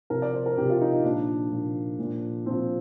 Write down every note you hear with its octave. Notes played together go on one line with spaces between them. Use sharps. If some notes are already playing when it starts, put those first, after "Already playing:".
C3 F3 A#4
D5
C5
A#4
C3 F3 G4
F4
D#4
D#4
A#2 F3 D4
A#2 F3
A#2 F3
A#2 F3 C4